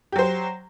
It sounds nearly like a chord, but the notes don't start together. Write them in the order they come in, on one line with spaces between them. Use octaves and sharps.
G4 F#3 C5